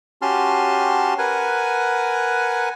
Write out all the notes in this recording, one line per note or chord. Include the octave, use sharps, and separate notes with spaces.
C#4 F#4 G4 A5 C6 F6
A#4 B4 F#5 G#5